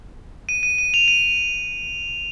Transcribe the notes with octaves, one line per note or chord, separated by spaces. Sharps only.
D#7
D#7
D#7
F7
D#7